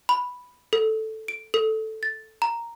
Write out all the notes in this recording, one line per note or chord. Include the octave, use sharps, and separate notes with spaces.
B5
A4
D7
A4
A6
A#5